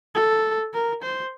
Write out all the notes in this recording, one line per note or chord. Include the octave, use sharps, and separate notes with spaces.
A4
A#4
C5